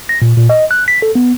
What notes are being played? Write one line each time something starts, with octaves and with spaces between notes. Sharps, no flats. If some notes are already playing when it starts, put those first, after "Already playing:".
A#6
A#2
A#2
D#5
F#6
B6
A4
B3